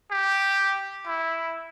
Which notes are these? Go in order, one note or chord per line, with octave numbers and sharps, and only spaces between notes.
G4
E4